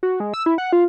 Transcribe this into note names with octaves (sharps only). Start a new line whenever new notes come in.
F#4
G#3
E6
E4
F#5
F4